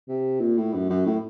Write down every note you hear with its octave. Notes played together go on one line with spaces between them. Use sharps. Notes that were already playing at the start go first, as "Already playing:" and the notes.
C3
A#2
A2
F#2
F#2
A2